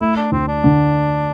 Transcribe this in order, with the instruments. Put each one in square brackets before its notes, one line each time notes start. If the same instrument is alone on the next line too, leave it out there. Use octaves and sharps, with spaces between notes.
[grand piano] A3 [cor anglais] E4
[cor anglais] D4
[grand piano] D2 [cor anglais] C4
[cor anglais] D4
[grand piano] D3